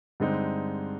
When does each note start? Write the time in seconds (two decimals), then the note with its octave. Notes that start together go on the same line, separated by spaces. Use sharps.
0.20 G2 D3 G#3 C4 D#4